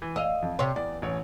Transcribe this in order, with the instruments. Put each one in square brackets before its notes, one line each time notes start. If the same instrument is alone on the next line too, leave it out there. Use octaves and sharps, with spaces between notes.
[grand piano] E3
[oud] D#5 F5 [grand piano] E6
[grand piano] F2
[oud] C3 C#5 [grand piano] C6
[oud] E2 [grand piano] D5
[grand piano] A1 C#5